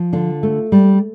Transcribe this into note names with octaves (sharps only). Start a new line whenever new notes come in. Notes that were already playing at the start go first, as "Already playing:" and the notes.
Already playing: F3
D3 F4
A3
G3